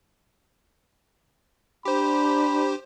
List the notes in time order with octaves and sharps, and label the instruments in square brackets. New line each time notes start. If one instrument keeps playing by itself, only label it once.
[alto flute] D4 [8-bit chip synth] G4 C5 [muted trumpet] B5